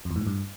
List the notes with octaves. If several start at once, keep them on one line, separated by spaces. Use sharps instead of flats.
F2
E2
G#2
A2
G2